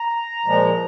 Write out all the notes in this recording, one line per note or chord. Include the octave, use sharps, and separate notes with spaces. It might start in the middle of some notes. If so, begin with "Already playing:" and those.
Already playing: A#5
A#2 F3 G#3